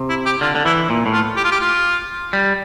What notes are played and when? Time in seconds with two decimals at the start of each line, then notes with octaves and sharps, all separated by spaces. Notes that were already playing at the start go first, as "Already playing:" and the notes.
Already playing: C3
0.09 E4
0.26 G4
0.41 D3 F4
0.55 D3
0.65 E3 E4
0.90 A#2
1.06 A2
1.13 F4
1.37 G4
1.45 F4
1.52 G4
1.61 F4
2.33 G3